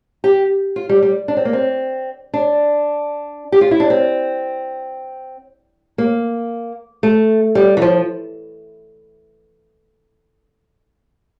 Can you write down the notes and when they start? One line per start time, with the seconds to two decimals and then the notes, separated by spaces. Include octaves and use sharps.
0.24 G4
0.76 F4
0.89 G3
1.02 G3
1.28 D4
1.37 C4
1.45 A#3
1.53 C4
2.34 D4
3.52 G4
3.61 F4
3.71 E4
3.80 D4
3.90 C4
5.98 A#3
7.03 A3
7.55 G3
7.77 E3
7.82 F3